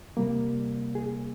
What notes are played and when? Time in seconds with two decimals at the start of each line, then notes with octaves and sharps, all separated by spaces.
0.17 C3 G3 A#3
0.95 G#4